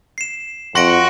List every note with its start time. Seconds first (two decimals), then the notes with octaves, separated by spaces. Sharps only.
0.18 C7 E7
0.75 F2 F#4 C6 A#6 D7